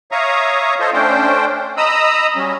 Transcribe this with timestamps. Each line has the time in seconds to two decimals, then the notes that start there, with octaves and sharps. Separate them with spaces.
0.12 C#5 E5 F5 A#5 C#6 D#6
0.80 F4 A4 C5 C#5 D#5
0.93 A3 C#4 D4 C5 G5
1.77 D#5 A#5 B5 D#6 E6
2.36 F#3 G3 C#4